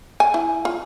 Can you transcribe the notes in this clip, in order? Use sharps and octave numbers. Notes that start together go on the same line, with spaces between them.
G#5
E4
F4